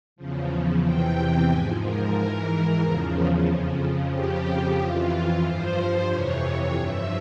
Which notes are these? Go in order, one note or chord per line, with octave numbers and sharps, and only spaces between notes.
E2 C#3 F3
E2 C3 E3 G5
G#2 F3 G#5
A#4
G#2 E3 A#4
E2 C#3 F3 A#4
F2 C#3 F3
F2 C#3 F3 G4
F2 E3 F4
G2 F3 C5
F2 C3 E3 C#5
G2 F3 E5